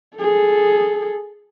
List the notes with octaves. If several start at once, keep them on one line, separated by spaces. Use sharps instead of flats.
G#4 A4